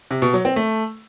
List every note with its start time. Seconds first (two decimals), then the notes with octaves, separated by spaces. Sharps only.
0.11 C3
0.22 B2
0.33 F#3
0.45 C4
0.56 A3